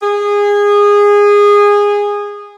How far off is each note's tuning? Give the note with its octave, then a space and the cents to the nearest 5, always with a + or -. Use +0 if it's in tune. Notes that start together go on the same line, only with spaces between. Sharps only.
G#4 -20